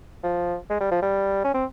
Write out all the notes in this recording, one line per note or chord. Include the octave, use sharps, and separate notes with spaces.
F3
G#3
G3
F3
G3
C#4
C4